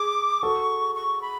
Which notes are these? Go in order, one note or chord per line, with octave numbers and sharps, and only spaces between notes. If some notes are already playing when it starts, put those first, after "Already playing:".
Already playing: G#4 D6
F#4 A4 C#6
C#6
B5